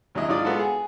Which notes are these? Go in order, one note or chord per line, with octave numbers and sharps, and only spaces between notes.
D#2 F#3 C#4 E4 D#5
G#2 F#3 D#4 F4 D5 D#6
G#3 B3 F4 F#4 A4
G#4